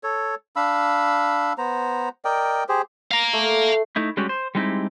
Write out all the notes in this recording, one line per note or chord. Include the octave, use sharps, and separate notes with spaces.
A4 C#5
D4 F5 B5 E6
B3 C5 A#5
A#4 D5 D#5 G5
G4 G#4 C5
F5 A#5
A3
A3 D#4 E4
G3 G#3 C#4 F#4 G4
C5
G3 G#3 C4 D#4 E4 G4